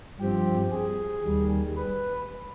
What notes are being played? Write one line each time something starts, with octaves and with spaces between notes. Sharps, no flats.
G2 F3 C4 G4
G#4
D#2 D#3 G3
B4